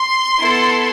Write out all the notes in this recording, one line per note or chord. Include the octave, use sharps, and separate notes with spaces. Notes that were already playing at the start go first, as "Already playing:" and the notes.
Already playing: C6
B3 E4 A4